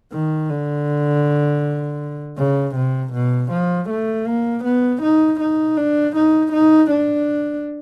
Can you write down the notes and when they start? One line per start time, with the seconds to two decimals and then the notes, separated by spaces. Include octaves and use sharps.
0.12 D#3
0.50 D3
2.38 C#3
2.75 C3
3.13 B2
3.52 F3
3.89 A3
4.27 A#3
4.65 B3
5.03 D#4
5.40 D#4
5.77 D4
6.16 D#4
6.53 D#4
6.91 D4